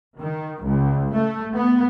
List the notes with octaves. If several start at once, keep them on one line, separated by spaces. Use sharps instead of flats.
D#3
C#2
A3
B3